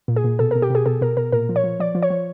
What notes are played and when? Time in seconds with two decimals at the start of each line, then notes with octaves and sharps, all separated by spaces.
0.08 A#2
0.16 G#4
0.24 A#2
0.39 B2 A4
0.51 B2 A#4
0.62 G4
0.70 B2 G#4
0.86 B2 A4
1.01 B2 A#4
1.17 B2 A#4
1.32 A#2 A#4
1.49 F3
1.56 C#5
1.64 F3
1.80 F3 D5
1.95 F3
2.03 C#5
2.10 F3